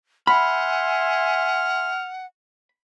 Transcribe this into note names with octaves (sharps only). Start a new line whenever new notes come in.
E5 F#5 G#5 B5 C6 F6